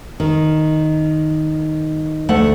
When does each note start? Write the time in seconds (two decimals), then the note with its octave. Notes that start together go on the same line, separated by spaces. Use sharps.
0.20 D#3
2.29 D2 A3 F#5